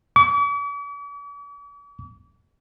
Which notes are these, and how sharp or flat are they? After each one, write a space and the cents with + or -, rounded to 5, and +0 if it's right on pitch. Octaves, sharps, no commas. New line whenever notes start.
D6 -45